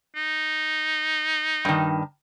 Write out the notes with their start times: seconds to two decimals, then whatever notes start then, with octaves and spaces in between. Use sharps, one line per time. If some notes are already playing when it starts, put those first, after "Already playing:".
0.15 D#4
1.65 G2 D#3